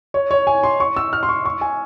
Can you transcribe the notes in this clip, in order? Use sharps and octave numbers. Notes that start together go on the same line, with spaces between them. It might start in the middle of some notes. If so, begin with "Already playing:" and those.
C#5
C#5
G#5
C6
C#6
E6
F6
C6
C#6
C#6
G#5